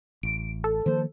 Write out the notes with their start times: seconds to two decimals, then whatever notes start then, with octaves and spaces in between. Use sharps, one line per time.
0.23 A1 D7
0.64 A4
0.86 D#3 F3 A#3 C5